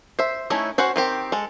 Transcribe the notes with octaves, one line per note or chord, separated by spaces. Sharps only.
C5 E5
A3 C#4 D#4 E4 C#5
C#4 F#4 C5 F#5
D#3 C4 G4
G#3 A4